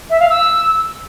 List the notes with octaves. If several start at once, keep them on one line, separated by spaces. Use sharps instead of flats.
E5
F5
E6